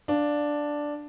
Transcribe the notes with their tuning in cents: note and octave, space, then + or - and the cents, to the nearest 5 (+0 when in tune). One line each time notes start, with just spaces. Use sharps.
D4 +0 F5 +0